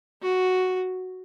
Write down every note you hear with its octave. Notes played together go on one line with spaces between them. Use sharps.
F#4